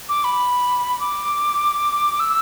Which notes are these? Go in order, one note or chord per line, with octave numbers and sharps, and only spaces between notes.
D6
B5
D6
E6